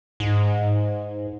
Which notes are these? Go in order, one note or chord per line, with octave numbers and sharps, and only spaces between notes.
G#2